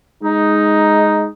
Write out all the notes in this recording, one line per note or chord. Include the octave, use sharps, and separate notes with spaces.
G#3 D#4